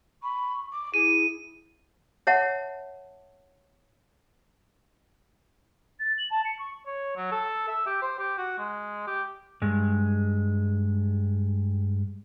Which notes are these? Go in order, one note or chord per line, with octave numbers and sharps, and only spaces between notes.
B5 C#6
D6
E4 G#4 D#7
C#5 E5 F#5 A5
A6
F#7
A5
C#7
C#6
C#5
F#3
A4
E5
G4
C5
G4
F#4
G#3
G4
G2 G#3